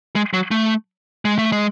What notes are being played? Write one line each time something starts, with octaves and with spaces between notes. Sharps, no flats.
G#3
F#3
A3
G#3
A3
G#3